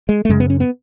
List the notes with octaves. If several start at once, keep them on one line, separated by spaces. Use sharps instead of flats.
G#3
A3
F#2 C#3 G#3
B3
C#4
B3